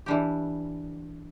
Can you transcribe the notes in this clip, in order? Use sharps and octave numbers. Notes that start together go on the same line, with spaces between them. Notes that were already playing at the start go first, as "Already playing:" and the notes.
E3 G3 D4 G4